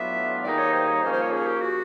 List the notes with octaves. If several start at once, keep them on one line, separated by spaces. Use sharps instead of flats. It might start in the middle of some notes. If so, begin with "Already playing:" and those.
Already playing: A2 F#3 B3 D4 F4 E5
D#3 G3 A#3 D#4 G#4 D5
C#5
C5
C#5
F3 A#3 C#4 C5
C5
C#5
G#4
G4
F#4